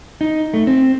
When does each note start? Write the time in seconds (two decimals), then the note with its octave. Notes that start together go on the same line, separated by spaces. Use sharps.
0.21 D#4
0.54 A3
0.67 C4